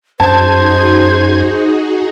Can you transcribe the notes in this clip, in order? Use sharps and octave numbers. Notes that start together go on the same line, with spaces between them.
F#2 D#4 F#4 G#4 C5 A5 G#6